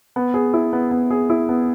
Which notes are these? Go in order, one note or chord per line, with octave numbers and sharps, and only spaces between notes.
B3
G#4
E4
B3
B3
G#4
E4
B3